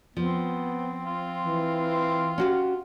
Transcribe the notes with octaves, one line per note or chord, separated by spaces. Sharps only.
F3 B3 C4
F4
E3
C#4 F#4 G4